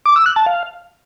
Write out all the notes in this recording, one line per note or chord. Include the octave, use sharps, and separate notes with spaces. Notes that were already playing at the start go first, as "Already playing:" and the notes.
D6
E6
F#6
A5
F5